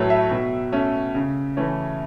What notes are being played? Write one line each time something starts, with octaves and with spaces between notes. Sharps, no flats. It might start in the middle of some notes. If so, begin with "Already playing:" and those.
Already playing: A2 F#3 A3 A4 B4 C#5
E5
B2
A3 C#4
C#3
E3 A3 C#4